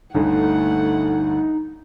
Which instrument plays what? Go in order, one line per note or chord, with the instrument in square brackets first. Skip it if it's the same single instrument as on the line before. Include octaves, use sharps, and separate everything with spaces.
[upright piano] G1 D2 [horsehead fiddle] A3 F#5 [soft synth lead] D#4